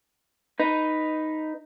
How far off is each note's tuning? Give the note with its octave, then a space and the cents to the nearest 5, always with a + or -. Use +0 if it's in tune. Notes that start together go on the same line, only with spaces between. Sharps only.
D#4 +0 B4 +0